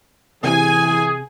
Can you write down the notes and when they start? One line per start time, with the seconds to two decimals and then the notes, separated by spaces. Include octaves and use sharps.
0.44 C3 E3 G#4 G#5